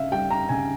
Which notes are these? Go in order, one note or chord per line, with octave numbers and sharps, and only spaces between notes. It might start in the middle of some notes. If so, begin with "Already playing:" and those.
Already playing: C#3 E5 F5
G3 G5
A#5
C#3 G#5